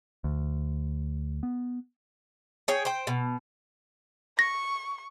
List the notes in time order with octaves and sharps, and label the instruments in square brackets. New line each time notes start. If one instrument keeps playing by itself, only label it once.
[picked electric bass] D2
B3
[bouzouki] G#4 C#5 G5
C5 G5
B2
[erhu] C#6 [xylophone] A#6